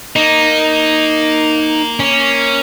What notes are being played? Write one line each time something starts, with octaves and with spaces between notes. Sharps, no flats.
A#3 D#4
C#4